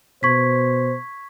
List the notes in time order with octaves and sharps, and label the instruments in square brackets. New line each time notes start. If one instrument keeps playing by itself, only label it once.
[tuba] B2 [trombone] C5 [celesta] C#6 G#6 B6